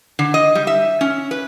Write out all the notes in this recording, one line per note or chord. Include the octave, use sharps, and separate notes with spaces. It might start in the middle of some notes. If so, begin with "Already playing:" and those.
D3
D#5
G3
E5
C#4
B4